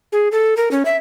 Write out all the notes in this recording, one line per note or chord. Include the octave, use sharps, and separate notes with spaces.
G#4
A4
A#4
C#4
E5